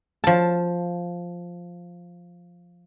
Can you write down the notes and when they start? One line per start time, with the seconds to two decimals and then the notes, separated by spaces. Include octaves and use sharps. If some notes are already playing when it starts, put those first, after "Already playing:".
0.24 F3 A5